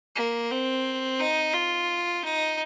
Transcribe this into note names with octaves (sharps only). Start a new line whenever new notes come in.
A#3
C4
D#4
F4
D#4